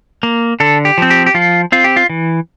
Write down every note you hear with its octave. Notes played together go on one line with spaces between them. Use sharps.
A#3
D3 A4
G4
F3 C4
G4
G4
F3 F4
C4 F4
G4
F4
E3